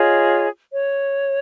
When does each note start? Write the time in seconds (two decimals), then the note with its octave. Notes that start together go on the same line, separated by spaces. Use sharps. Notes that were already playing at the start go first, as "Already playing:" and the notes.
Already playing: F4 G#4 C#5 D#5
0.73 C#5